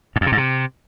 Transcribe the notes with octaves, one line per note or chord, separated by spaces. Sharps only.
G#2
F2
C3
G#2
C3